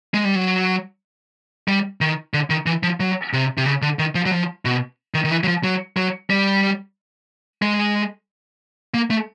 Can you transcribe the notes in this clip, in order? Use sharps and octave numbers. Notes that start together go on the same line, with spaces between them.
G#3
G3
F#3
G3
D#3
D3
D#3
E3
F3
F#3
C3
C3
C#3
D3
D#3
F3
F#3
F3
B2
D#3
D#3
E3
F#3
F3
F#3
F#3
G3
G#3
A#3
A3